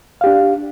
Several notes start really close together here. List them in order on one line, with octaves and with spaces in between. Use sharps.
F5 G4 D4